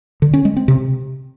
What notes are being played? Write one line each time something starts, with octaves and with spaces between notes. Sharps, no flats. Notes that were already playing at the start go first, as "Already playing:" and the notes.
D3
C#4
G#3
C4
C3